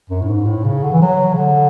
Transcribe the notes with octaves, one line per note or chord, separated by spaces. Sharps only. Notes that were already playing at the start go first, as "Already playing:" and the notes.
F#2
A2
G#2
A2
C#3
D3
E3
F#3
C#3
D3